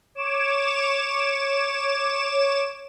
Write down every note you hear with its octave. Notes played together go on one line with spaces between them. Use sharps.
C#5 D6 E7